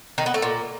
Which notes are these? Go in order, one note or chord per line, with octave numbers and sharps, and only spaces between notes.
D#3
B3
A3
A#2